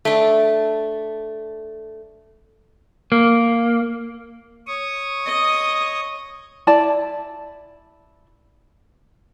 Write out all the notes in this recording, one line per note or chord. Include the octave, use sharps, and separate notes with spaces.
A3 D4
A#3
C#5 C#6 D#6
D#5
E4 D5 A5